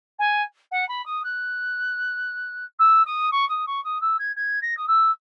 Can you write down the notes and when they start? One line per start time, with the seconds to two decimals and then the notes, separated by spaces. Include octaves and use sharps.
0.19 G#5
0.71 F#5
0.88 B5
1.05 D#6
1.24 F#6
2.79 E6
3.06 D#6
3.31 C#6
3.49 D#6
3.67 C#6
3.84 D#6
4.01 E6
4.19 G#6
4.36 G#6
4.62 A#6
4.77 D#6
4.87 E6